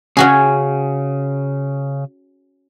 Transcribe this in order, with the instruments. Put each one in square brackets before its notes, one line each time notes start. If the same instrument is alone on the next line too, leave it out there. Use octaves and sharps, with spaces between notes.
[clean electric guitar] C#3 [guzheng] C#4 F#4 G#4